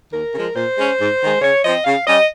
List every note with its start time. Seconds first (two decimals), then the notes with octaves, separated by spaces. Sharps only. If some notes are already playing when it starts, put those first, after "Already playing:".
0.11 D#2 A#4
0.33 C#3 F3 G#3
0.55 A#2 C5
0.76 G#3 C#4
0.99 G#2
1.21 D#3 G#3
1.41 C#3 C#5
1.63 F3 C4 D#5
1.85 C#3 F5
2.06 G3 C#4 D#5